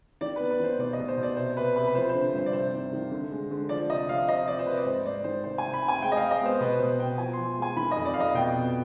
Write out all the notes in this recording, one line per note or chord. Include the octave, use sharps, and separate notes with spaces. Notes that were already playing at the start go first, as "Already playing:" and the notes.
D#3 D5
B3 B4
B4
D#3 C5
B2 D5
D#5
B2
C5
B2
D5
C3 C5
C3 B4
C3 B4
B4
F3 C5
C5
D3
G2 C5
D5
C3 C5
D#3
D#3
D3
G#3
D3
F3 D5
C3 D#5
C3 F5
C4 D#5
F3 D5
C5
C3 B4
D5
G#2 C5
G#2 D5
D#3 C5
C3 C5
G#5
C3
B5
C4
G#5
G#3 G5
D#5
G#3 F5
D#5
B3 C5
B2 B4
B2 C5
B3 G5
F3 G#5
F3 C6
G#3
G#5
D#3 B5
D#5
F2
D5
F2 F5
D#5
B2 G5
B3